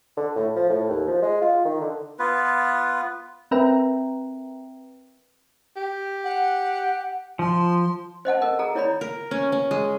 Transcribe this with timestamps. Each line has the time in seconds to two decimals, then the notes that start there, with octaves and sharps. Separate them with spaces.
0.17 D3
0.36 A2
0.56 F3
0.70 A2
0.90 D#2
1.08 F3
1.22 G#3
1.42 F4
1.65 D#3
1.81 D3
2.19 B3 F4 B4
3.51 C4 A#4 B4 E5 G5 A#5
5.76 G4
6.24 F#5
7.39 F3 C6
8.25 C5 D#5 F#5 A5
8.41 A4 A#4 D#5
8.59 G#4 A4 A#5
8.75 E4 C#5 D5 A#5 B5
9.01 A#4
9.31 C#4
9.52 C#4
9.71 G#3